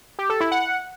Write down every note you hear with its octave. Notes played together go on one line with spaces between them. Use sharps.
G4
A4
E4
F#5